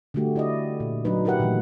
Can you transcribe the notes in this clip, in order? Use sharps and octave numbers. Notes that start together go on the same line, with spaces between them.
D3 G3 A3 F#4 G4
E4 D5 D#5
A#2
F#3 D4 D#4 B4
E4 G4 A#4 B4 F#5
A#2 D#3 E3 F#3 A3